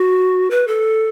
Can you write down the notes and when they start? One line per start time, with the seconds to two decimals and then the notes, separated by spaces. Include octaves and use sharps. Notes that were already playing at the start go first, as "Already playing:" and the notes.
Already playing: F#4
0.51 B4
0.67 A4